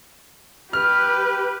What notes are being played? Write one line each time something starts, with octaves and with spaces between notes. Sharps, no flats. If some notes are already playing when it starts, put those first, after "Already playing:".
G4 B4 F6